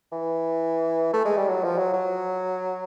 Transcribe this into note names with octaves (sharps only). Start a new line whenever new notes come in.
E3
A3
G#3
G3
F#3
F3
F#3
F#3